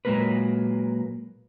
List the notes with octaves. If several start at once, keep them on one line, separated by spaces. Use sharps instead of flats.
A#2 F#3 G#3 A#3 A#4 B4